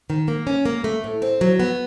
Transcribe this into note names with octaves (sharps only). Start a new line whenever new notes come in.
D#3
A#3
C#4
A#3
A3
A2
C4
F#3
B3